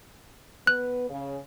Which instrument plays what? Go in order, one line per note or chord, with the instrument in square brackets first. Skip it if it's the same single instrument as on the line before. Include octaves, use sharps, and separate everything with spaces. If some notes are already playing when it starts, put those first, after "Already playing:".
[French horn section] B3 B4 [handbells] F#6
[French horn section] C#3